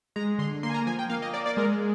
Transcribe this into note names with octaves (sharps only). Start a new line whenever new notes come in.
G#3 A#5
D3 C6
A#3 C6
G#5
A#5
F3 G#5
G5
A#3 F5
D#5
A#3 D5
D5
G#3 A#4